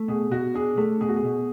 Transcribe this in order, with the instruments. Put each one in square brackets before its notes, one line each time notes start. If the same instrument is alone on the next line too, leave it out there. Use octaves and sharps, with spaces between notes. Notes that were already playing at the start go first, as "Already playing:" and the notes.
Already playing: [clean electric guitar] A3
[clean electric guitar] B2 [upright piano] G#4
[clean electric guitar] B2 [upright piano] F#4
[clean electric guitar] D4 [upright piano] G#4
[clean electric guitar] A3 [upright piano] A4
[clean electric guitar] B2 [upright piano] G#4
[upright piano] F#4
G#4
[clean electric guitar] B2